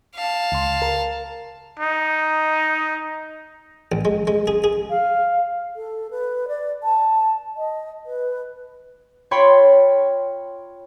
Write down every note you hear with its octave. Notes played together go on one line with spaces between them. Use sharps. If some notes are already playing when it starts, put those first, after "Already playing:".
F5 A5
C#2 C6
A#4
D#4
A1
G#3
G#3
G#4
G#4
F5
A4
B4
D5
A5
D#5
B4
F4 C#5 G5 B5 C6